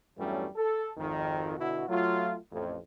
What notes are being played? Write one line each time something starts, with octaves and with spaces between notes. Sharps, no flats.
E2 G2 F#3 G3 A3 C#4
A4
G#1 F2 D#3
B2 D3 E4 F#4
F#3 A3 F4
A1 F2